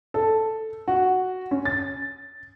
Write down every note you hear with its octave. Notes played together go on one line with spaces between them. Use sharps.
A4
F#4
C#4
A6